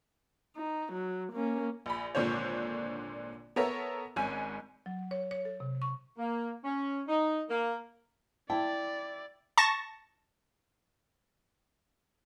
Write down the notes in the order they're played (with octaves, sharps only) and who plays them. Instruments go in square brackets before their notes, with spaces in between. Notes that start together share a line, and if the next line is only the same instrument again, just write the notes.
[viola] D#4
F#3
A#3 C#4
[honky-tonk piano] A#1 B5
G#1 A#2 D3 D4 C5 C#5
B3 A4 A#4 C#5 E5
G#1 G#2 C#4 G#5
[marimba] F#3
C#5
C#5
A4
C3
C#6
[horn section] A#3
C#4
D#4
A#3
[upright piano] E4 [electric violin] D5 [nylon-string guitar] G5 [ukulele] A5
[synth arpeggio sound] A5 C#6 A6 A#6